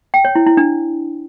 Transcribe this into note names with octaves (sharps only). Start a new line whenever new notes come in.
G5
C#5
E4
E4
D4